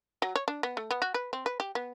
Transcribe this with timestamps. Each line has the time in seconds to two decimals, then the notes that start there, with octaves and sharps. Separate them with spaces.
0.22 F#3
0.36 C#5
0.48 D4
0.63 B3
0.77 A3
0.91 B3
1.02 F#4
1.14 B4
1.33 C4
1.46 B4
1.60 G4
1.75 B3